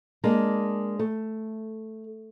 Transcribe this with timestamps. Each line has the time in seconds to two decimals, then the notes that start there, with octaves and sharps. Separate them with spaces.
0.24 G#3 A#3 D4
0.99 A3